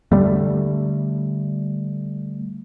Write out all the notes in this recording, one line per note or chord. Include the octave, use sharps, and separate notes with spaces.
D3 G3 A3